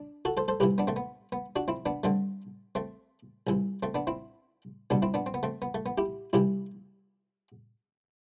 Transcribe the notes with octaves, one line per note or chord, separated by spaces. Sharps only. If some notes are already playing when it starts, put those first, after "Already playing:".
Already playing: D4
F#4 A4
A4 C5
A4 C5
C2 C3 E3 G4 B4
B3 D4
A3 C4
B3
B3
D4 F#4
C4 E4
B3 D4
G2 D3 A3 C4
A3 C4
C2 C3 E3
A3 C4
B3 D4
C4 E4
C2 B2 B3 D4
C4 E4
B3 D4
C4
B3
A3 C4
B3
A3
B3
E4 G4
C2 C3 E3 E4 G4